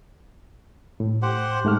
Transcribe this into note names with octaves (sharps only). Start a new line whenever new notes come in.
A2
G4 C5 F#5
G#2 A3 F6